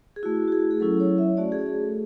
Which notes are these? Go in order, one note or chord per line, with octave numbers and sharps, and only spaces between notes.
G#4
A3 E4 F#4
F#4
G#4
G#4
F#3 C#4 E4 A4
C#5
E5
A3 C#4 F#4 D5
G#4
G#4
A4